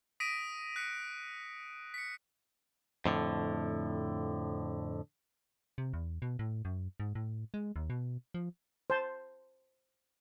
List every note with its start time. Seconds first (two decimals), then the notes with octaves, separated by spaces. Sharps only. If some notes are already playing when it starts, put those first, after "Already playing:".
0.20 D#6 A#6 B6 D7 D#7
0.76 F#6 B6 C#7
1.94 B6 C#7
3.05 F2 A2 D3
5.78 C3
5.93 E2
6.22 B2
6.39 A2
6.65 F#2
7.00 G#2
7.15 A2
7.54 G#3
7.76 D#2
7.90 B2
8.34 F3
8.90 C5 A5